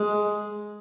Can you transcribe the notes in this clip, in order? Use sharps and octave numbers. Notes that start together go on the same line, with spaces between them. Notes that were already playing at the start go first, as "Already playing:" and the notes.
Already playing: G#3